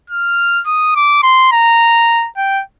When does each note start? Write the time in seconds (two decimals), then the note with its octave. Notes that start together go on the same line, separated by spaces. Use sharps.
0.10 F6
0.66 D#6
0.96 D6
1.23 C6
1.52 A#5
2.37 G5